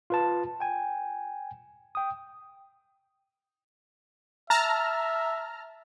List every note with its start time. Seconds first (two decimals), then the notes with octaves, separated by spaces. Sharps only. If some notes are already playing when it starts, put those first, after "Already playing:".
0.10 F4 B4 A5
0.60 G5 G#5
1.95 G5 D#6
4.50 E5 A5 A#5 F6